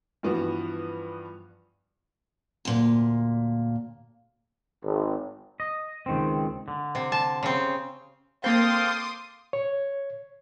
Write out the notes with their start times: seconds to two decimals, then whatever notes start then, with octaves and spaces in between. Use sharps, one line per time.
0.23 G2 E3 F3 B3 F#4
2.65 D2 A#2
4.83 G#1
5.60 D#5
6.06 C#2 D#3 C4
6.68 D3
6.95 C3
7.12 A5
7.43 C#3 C4
8.44 A#3 C4 A4 F5 G5 C6 D6 D#6
9.53 C#5